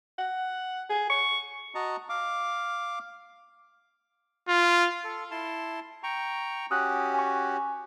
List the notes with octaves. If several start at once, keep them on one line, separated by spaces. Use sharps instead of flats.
F#5
G#4
C#6
F#4 D#5 A5 A#5
F5 D6
F4
A4
E4 A5 C6
G5 A#5 C#6
C#4 F#4 G4 D#6 F#6
G#5 C#6